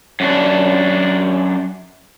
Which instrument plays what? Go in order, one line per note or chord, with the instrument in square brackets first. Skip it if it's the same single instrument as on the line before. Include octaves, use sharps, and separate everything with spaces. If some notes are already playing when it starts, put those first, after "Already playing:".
[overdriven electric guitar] F#2 D4